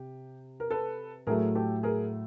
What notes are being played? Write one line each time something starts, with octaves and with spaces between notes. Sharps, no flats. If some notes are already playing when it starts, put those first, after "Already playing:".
Already playing: C3 G4
A#4
A4 B4
A2 F#3 A3 G#4 A#4
G4 A4
G#4 A#4